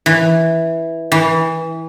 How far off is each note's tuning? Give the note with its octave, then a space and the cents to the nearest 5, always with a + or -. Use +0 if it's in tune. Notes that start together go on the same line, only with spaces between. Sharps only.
E3 -5
E3 -20